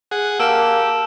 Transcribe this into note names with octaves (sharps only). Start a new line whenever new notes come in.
G#4 F#5
A#3 G4 A5 E6 F6 D7 E7 G7